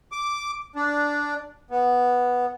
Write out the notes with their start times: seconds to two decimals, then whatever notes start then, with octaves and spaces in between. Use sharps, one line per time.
0.12 D6
0.76 D4
1.71 B3